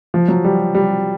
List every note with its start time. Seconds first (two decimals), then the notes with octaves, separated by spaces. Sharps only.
0.14 F3
0.28 F#3
0.44 G3
0.75 G3